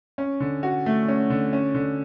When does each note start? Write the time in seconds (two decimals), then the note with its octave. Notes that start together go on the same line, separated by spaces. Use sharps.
0.18 C#4
0.40 D3
0.63 F#4
0.86 A3
1.08 C#4
1.30 D3
1.53 C#4
1.74 D3